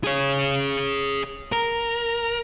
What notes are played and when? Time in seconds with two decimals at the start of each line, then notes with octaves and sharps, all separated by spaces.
0.04 G#4 C#5
1.52 A#4